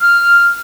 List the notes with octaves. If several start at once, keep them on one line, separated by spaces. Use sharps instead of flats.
F6